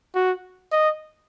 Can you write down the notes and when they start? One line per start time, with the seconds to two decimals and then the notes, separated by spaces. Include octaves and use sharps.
0.15 F#4
0.72 D#5